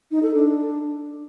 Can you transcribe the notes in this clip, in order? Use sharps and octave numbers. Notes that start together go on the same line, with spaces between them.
D#4
A4
D4